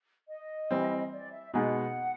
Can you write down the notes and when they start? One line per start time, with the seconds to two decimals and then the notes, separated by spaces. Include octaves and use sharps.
0.28 D#5
0.71 E3 G3 C4
1.13 D5
1.33 E5
1.54 B2 G#3 B3 D#4 G#4 F#5